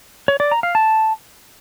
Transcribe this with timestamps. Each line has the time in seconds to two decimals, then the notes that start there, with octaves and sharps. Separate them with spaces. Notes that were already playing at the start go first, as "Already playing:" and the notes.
0.28 C#5
0.40 D5
0.52 A#5
0.63 F5
0.75 A5